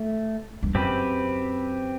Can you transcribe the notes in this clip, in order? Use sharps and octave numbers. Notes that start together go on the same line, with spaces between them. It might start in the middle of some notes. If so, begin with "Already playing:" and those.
Already playing: A3
G2
F#2 C4 G4 B4